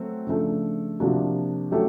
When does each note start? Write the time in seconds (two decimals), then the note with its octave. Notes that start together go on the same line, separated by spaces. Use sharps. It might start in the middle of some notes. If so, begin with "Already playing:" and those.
Already playing: F#3 A3 C4
0.27 C#3 F3 A3 D4
1.00 C3 F3 A#3 D4 F#4
1.71 F#3 A3 C#4 E4 G4